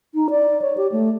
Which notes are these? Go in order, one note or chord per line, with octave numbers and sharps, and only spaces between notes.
D#4
D5
C#5
G4
A3